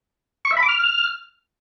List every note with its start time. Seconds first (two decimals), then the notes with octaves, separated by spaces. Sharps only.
0.45 C#6
0.51 E5
0.57 B5
0.63 D6
0.68 F6